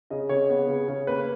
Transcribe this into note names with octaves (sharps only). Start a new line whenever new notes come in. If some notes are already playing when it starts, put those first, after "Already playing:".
C#3 D#5
C#3 C#5
B3
C#3
C#3
A#3 B4